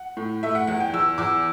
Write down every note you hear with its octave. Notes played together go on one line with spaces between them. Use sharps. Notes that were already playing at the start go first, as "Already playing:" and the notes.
Already playing: F#5
A2
A3 E5
F#5
E2 F#5
G5
E2 E6
E2 D6